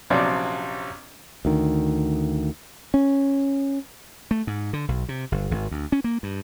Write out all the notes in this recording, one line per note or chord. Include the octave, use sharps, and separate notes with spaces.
A#1 C3 F#3 C4 C#4 D5
D2 D#3
C#4
A3
G#2
D3
B1
C3
G1
G#1
D2
C#4
A#3
G2